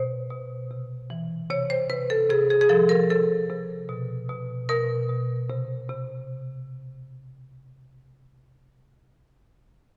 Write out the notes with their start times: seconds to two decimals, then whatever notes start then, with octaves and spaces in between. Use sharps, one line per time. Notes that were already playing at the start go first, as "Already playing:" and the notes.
Already playing: B2 C5
0.30 B2
0.71 C3
1.10 E3
1.50 C3 C#5
1.70 C5
1.90 C3 B4
2.10 A4
2.30 C3 G#4
2.50 G#4
2.61 G#4
2.69 F3 A4
2.89 A#4
3.10 C3 A4
3.50 C3
3.89 B2
4.29 B2
4.69 B2 A#4
5.09 B2
5.50 C3
5.89 C3